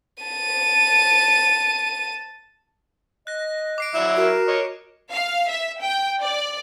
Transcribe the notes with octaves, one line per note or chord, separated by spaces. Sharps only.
A5 D#7
D#5 F#6 A#6
D6 C7 D7
F#3 E4 D5 E5 D6 E7
F#4 A#4
C#5 D#5
F5
E5
G5
D5